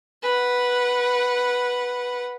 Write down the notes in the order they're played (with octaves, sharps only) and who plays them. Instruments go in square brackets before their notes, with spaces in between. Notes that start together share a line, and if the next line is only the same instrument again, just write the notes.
[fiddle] B4 F#5